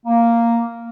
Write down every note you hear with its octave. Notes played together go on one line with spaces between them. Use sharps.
A#3